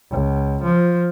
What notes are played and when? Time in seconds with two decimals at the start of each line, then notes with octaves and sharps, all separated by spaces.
0.10 C#2
0.63 F3